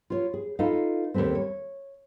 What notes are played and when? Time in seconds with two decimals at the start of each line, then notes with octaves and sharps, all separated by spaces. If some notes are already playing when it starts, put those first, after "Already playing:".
0.10 F4 C#5
0.34 G#4
0.59 D#4 F4 A4 B4 D#5 F5
1.14 D#2 D#3 G3 A3 C4
1.35 C#5